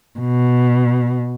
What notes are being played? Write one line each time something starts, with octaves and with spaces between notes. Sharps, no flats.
B2